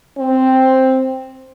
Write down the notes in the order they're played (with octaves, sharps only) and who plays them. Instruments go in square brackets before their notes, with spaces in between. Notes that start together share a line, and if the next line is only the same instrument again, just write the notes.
[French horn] C4